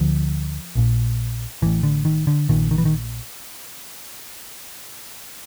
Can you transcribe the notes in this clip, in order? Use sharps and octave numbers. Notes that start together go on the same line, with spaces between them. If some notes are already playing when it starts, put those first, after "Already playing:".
Already playing: D2 D3 F3
A#1 A#2
A1 A2 E3
D3
D#3
D3
A#1 A#2 D#3
D#3
E3
D#3